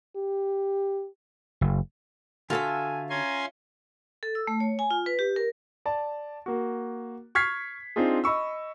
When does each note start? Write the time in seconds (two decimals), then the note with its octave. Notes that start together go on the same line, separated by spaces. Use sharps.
0.16 G4
1.61 F#1
2.50 D3 F4 F#4 A4 E5 G#5
3.10 C#4 G#5 A#5 C6
4.23 A4
4.35 E6
4.47 A3
4.60 C#5
4.79 G#5
4.91 F4
5.06 B4
5.19 G4
5.36 A#4
5.86 D5 A5
6.46 A#3 F#4
7.35 C#6 F6 G#6 B6 C7
7.96 C4 D4 D#4 F4 G#4
8.24 D#5 B5 C#6 E6